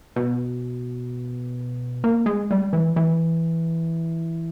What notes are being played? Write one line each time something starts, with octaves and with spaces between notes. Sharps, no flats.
B2
A#3
G#3
G3
E3
E3